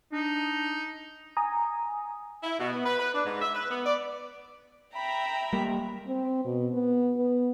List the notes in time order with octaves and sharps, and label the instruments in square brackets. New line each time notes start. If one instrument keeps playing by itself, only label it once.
[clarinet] D4 [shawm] D#4
[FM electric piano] G#5 A#5 D#6
[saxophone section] E4
B2
B3
B4
B4
D4
G#2
E5
B4
B3
D5
[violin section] E5 G5 A#5 [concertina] B5
[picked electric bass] G3 A#3
[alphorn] C4
B2
B3
B3